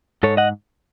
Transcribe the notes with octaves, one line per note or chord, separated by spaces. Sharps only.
G#2 A4 C#5
D#5 F#5